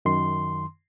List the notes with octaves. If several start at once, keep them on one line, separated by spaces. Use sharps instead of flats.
F#2 D#3 C6